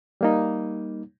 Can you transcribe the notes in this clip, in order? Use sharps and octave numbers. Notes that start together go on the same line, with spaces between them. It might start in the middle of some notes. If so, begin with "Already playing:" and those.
G3 A#3 D#4